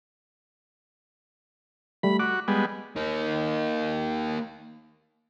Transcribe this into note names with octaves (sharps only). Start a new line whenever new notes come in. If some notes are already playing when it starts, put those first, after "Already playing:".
G3 A3 B5
F#4 D6
G3 G#3 B3
A#3 D#4